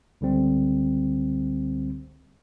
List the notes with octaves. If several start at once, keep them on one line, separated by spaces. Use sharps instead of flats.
C#2 D3 G3 C4